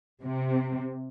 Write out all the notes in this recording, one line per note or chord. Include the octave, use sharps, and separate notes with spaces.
C3